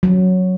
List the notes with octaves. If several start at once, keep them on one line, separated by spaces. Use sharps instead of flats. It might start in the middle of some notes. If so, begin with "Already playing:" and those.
F#3